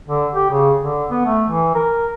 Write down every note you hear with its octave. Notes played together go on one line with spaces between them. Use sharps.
D3
G4
C#3
D3
B3
A3
E3
A#4